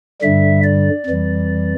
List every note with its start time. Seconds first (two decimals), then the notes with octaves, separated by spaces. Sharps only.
0.21 G2 D3 G3 E5
0.64 D5
1.06 F2 E3 G3